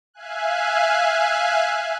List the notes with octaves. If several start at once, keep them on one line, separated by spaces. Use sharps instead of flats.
E5 F5 G#5 F#6